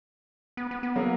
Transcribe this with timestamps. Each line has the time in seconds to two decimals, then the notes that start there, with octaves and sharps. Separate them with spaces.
0.57 B3
0.71 B3
0.83 B3
0.96 F#3 A#3